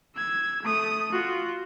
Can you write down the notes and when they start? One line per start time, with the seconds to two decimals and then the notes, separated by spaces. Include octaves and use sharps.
0.16 E6 G#6
0.63 A3 D#6
1.12 F4 F#4